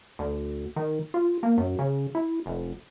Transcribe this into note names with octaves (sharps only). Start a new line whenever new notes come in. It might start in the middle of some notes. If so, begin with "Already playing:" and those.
D2
D#3
F4
A#3
F#2
C#3
E4
F1